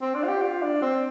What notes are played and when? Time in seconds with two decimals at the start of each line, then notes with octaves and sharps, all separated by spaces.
0.02 C4
0.15 D4
0.24 F4
0.28 G4
0.42 F4
0.62 D4
0.82 C4